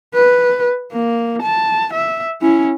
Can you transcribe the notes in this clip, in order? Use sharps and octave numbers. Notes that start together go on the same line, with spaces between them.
B4
A#3
A5
E5
C#4 E4